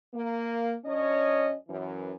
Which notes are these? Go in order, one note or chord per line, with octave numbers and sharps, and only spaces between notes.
A#3
F#2 C#4 D4 C#5 D#5
F#2 E3